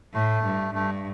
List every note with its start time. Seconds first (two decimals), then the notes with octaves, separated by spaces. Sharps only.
0.14 A2 A3
0.44 G2
0.74 G2 A3